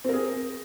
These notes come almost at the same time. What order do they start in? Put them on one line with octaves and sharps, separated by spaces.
C4 A#4 G#4